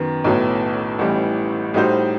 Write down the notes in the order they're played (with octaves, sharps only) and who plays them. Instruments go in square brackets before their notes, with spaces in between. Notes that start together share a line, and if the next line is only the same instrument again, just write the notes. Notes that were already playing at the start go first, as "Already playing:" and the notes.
Already playing: [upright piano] F#2 D#3 B3
B1 A2 F#3 B3
A1 A2 E3 G3
A2 G3 D#4 F#4 C5